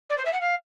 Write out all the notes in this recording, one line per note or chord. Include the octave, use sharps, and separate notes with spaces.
D5
C5
E5
F#5
F5